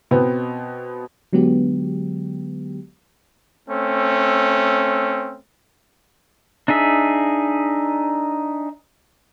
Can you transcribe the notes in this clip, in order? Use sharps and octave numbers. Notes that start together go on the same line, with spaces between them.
B2 B3 C4
D3 F#3 G#3 B3 G4
A3 C4 C#4
D4 D#4 G#4 E5